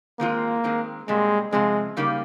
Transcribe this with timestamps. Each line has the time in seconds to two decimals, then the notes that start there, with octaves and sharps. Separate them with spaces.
0.19 D#3 G#3 A#3 C4 F4
0.64 D#3 G#3 C4
1.08 A#2 G3 G#3 C4
1.53 C3 F3 G#3 C4
1.97 C#3 G3 A#3 D#4